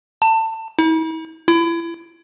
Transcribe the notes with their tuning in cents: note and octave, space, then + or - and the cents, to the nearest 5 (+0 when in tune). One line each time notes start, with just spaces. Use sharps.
A5 +25
E4 -45
E4 +30